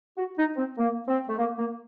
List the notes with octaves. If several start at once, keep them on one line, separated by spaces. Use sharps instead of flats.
F#4
D#4
C4
A#3
C4
A3
A#3
A#3